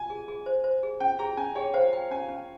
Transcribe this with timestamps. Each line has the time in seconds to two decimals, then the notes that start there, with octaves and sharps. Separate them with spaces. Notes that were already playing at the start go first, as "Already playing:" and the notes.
Already playing: G#5
0.10 G#4
0.28 G#4
0.46 C5
0.64 C5
0.83 G#4
1.00 C#4 G5
1.19 G#4 A#5
1.37 C#4 G#5
1.55 G#4 C#5
1.74 C5 F5
1.93 G5
2.11 C#4 G#5
2.29 C#4